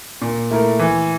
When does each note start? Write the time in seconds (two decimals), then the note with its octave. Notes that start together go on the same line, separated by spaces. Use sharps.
0.22 A#2
0.51 A3 E4 A#4
0.79 E3